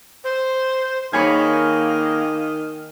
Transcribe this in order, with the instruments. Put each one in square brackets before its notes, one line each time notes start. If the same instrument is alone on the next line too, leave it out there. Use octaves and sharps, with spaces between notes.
[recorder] C5
[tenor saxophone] D#3 [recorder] A#3 [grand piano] D#4 G#4 C#5 [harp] G#5 B5 C#6